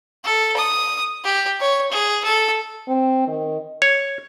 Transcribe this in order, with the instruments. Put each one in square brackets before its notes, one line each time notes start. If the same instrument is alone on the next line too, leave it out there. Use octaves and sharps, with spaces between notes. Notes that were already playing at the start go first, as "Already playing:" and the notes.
[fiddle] A4
D#6
G4
C#5
G#4
A4
[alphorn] C4
D#3
[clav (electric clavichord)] C#5